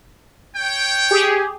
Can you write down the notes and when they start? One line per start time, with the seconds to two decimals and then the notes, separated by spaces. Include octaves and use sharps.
0.56 C#5 G5
1.11 G4 G#4